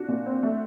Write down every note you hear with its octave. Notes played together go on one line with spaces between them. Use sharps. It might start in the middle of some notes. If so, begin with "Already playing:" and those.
Already playing: D4 F#4
A#2
C4
A3